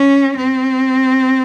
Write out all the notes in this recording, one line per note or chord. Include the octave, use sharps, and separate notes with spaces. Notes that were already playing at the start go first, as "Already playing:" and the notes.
Already playing: C#4
C4